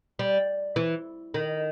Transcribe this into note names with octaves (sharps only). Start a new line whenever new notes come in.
G3
E3
D#3